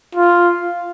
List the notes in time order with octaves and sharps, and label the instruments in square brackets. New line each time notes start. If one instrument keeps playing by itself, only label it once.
[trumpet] F4